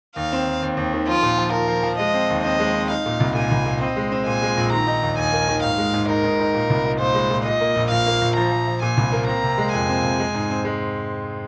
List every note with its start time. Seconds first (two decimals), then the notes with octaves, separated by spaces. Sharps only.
0.16 D#2 F5
0.32 C4
0.47 D#2
0.62 D#2
0.77 D#2
0.93 D#3
1.08 F3 F4
1.22 A#2
1.38 F3
1.53 F3 A#4
1.68 F3
1.83 F3
1.98 G#3 D#5
2.14 C4
2.30 D#2
2.44 C4 D#5
2.60 G#3
2.74 C4
2.90 D#4 F5
3.06 A#2
3.20 C2
3.35 A#2 G#5
3.51 C2
3.66 A#2
3.81 C4 D#5
3.97 G#3
4.12 C4
4.26 A#2 G#5
4.42 G#3
4.57 A#1
4.72 D#3 A#5
4.87 D#4
5.03 D#2
5.18 D#2 G#5
5.33 A#3
5.48 D#3
5.63 G#2 F5
5.78 G#3
5.94 G#2
6.09 D#4 A#4
6.24 G#2
6.40 D#4
6.54 A#2
6.70 C2
6.85 D#4
7.00 A#2 C5
7.15 G#3
7.30 A#2
7.45 A#2 D#5
7.60 A#3
7.76 A#1
7.90 A#1 F5
8.06 A#3
8.21 A#1
8.36 F3 A#5
8.52 F3
8.68 F3
8.82 A#2 G#5
8.97 C2
9.12 A#3
9.27 C4 A#5
9.43 C3
9.58 G#3
9.73 F2 G#5
9.89 C4
10.04 C3
10.19 G#3
10.34 G#2
10.50 C4
10.65 G#3